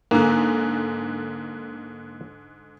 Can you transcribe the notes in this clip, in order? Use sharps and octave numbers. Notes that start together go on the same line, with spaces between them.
G#2 D3 A#3